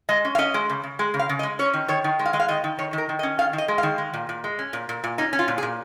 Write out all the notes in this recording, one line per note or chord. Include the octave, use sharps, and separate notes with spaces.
G#3 D#5
C#4
F5
C#4 D#5
G#3
C#3
C#3
G#3
C#3
F5
C#3
D#5
G#3
C#4 C#5
D#3
D#3 C#5
D#3
G#3
F5
G#3 D#5
F5
D#3 D#5
D#3
D#3 C#5
D#3 A#4
D#3
D#5
C#4
D#3 F5
D#3
D#5
G#3
D#3 F5
G#3
A#2
A#2
G#3
C#4
A#2
A#2
A#2
C#4 D#4
C#4
F4
A#2
G#4
A#2